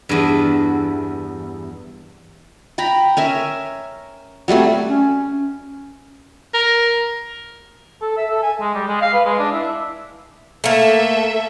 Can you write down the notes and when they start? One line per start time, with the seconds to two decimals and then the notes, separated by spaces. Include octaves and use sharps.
0.09 E2 G2
2.78 G5 A#5 B5
3.17 C#4 A#4 E5
4.48 F#3 G3 A3 C4
4.88 C#4
6.54 A#4
8.02 A4
8.18 E5
8.31 A4
8.43 G#5
8.60 G#3
8.75 G3
8.88 G#3
9.01 F5
9.14 B4
9.25 G#3
9.39 D4
9.52 E4
10.64 A3 A#3 A4 E5